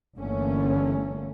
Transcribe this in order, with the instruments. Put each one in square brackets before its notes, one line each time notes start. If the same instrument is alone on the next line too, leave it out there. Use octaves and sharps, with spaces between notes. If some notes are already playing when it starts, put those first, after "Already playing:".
[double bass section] G1 D3 E3 A3 A#3 C#4